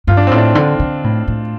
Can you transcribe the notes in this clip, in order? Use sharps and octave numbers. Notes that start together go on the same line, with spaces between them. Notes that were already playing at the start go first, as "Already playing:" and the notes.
G2 F4
D4
A2 C4
D4
D3
D3
A2
A2